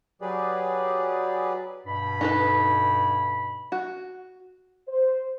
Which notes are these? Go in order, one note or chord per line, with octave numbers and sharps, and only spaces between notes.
F#3 G4 G#4 B4 D5
G2 B2 B5
D#4 A4 B4
F#4
C5